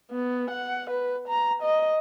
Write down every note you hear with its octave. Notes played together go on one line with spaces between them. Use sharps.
B3
F#5
B4
A#5
D#5